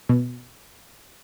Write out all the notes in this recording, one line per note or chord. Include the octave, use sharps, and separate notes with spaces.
B2